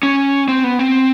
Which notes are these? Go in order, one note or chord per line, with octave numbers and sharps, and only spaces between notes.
C#4
C4
B3
C4